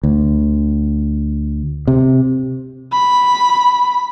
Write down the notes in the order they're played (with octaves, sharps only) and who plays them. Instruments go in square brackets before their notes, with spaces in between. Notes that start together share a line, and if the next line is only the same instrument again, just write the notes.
[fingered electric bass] D2
C3
[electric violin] B5